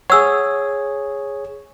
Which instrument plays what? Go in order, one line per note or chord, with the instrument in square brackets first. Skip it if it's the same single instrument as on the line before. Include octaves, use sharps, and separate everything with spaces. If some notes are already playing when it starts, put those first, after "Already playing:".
[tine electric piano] G#4 C#5 [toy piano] F#5 E6